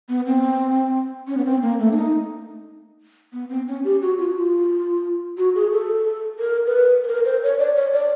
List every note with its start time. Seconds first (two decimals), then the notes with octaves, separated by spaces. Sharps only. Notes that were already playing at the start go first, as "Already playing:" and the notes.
0.09 B3
0.26 C4
1.28 C#4
1.37 B3
1.45 C4
1.62 A#3
1.79 A3
1.92 D4
1.96 D#4
3.33 B3
3.49 C4
3.67 C#4
3.84 G4
4.01 F#4
4.18 F4
4.28 F#4
4.35 F4
5.38 F#4
5.55 G#4
5.72 A4
6.39 A#4
6.66 B4
7.04 B4
7.08 A#4
7.25 C5
7.43 C#5
7.59 D5
7.76 C#5
7.93 D5